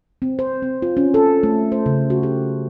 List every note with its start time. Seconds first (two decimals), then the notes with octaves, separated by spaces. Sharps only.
0.22 C4
0.39 C5
0.62 C4
0.82 F4
0.97 C#4
1.14 A4
1.43 A3
1.72 C5
1.86 C#3
2.10 F#4
2.23 G4